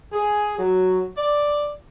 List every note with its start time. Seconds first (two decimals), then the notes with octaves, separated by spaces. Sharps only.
0.13 G#4
0.59 F#3
1.18 D5